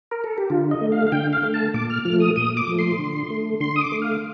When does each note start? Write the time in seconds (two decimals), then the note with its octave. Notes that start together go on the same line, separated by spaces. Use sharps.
0.11 A#4
0.24 A4
0.38 G4
0.50 D3 F4
0.71 D#5
0.81 A3
0.92 F5
1.07 F5
1.12 D3 G5
1.33 F5
1.43 A3
1.54 A5
1.74 A#2 D6
1.90 F6
2.05 F3 A3 F6
2.20 D#6
2.36 A#2 D#6
2.57 D6
2.68 F3 A3
2.79 C6
2.98 D3
3.30 A3
3.60 D3 C6
3.76 D#6
3.82 D6
3.92 A3
4.02 F5